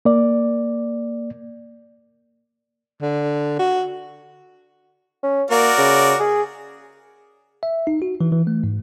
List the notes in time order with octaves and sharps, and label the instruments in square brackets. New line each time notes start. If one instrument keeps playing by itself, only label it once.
[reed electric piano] A#3 D5
[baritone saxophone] D3
F#4
[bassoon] C#4
[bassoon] A#3 [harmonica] F#4 A#4 D5
[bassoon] C#3
G#4
[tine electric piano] E5
D#4
F#4
E3
E3
A3
G#2